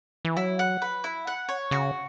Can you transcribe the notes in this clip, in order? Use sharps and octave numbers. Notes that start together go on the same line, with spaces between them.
E3
F#3 E4
F#5
B4
E4
F#5
C#5
C#3 F#4